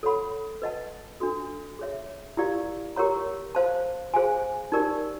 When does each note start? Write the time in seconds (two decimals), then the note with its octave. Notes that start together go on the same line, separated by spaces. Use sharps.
0.03 A4 C#5 F#5 B5
0.62 B4 D#5 F#5 A5
1.20 D4 F#4 A4
1.79 G#4 C#5 E5
2.37 E4 G4 A#4 D5 F5
2.96 G4 A#4 C#5 F#5 A#5
3.55 C5 F5 A5
4.14 G#4 C5 F5 G#5
4.72 D#4 G4 A#4 D5